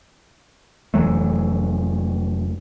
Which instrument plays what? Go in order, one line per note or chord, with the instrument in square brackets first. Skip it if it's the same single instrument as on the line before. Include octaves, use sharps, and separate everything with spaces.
[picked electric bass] F1 E3 F#3 A3